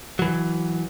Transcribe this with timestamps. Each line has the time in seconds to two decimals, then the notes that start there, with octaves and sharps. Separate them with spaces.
0.19 E3 F#3